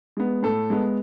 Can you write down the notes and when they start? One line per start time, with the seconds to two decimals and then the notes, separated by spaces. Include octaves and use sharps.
0.17 G#3 B3
0.43 A2 A4
0.70 G#3 B3